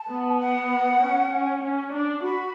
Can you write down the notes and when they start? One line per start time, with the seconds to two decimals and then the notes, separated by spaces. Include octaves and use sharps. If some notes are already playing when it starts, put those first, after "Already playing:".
Already playing: A5
0.09 B3
0.39 F#5
1.01 C#4
1.32 C#4
1.63 C#4
1.93 D4
2.24 F#4 B5